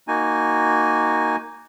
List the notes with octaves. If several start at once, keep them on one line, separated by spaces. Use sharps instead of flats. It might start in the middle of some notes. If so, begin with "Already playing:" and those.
A#3 D#4 F#4 G#5